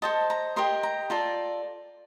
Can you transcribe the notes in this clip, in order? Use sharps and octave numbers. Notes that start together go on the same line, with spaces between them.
A4 C5 D#5 A5
A#5
G4 A#4 D#5 C6
A#5
F4 A4 D5 A#5